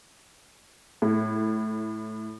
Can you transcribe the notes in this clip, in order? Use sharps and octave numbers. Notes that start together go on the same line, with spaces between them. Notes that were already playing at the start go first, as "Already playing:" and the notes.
A2